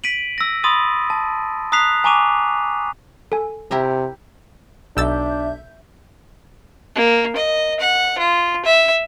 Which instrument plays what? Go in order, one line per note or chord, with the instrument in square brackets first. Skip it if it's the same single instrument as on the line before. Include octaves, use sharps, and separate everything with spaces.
[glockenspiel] B6 D7 D#7 F#7
E6 A#6
B5 C6 D#6 A6 D#7
A5
A#5 D#6 F#6 B6 C7 F7
G#5 A#5 C#6 D6 D#7 F7
[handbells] A4 G#5
[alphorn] C3 [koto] E4 G4 A#4
[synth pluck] B1 E6 A6 [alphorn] D4 [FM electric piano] E5 G6
[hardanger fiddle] A#3
D#5
F#5
F4
E5